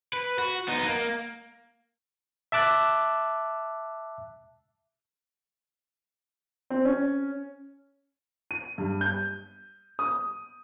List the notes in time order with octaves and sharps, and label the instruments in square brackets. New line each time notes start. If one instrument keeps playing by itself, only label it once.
[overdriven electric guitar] B4
F#4
B3 D#4
A#3
[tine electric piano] E5 A5 D6 F#6 A6
[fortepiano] C4
C#4
[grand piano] D#7
G2
G6
D#6